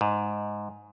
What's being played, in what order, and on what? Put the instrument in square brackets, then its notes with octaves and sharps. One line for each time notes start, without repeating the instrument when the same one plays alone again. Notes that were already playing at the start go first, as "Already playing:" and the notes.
[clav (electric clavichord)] G#2